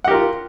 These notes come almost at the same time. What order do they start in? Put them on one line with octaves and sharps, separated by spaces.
F#5 G4 A#4 F4